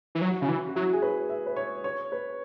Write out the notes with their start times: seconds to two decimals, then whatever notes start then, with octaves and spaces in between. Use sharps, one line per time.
0.15 E3
0.21 F#3
0.30 F#4
0.40 C#3 E4
0.48 E3 C#4
0.69 F#4
0.75 F#3 E4
0.93 G#4
1.02 B4
1.30 E5
1.46 B4
1.56 C#5
1.84 C#5
2.12 B4